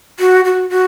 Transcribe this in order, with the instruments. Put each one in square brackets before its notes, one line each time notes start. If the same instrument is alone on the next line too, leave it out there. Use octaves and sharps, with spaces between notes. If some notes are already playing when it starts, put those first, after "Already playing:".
[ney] F#4
F#4
F#4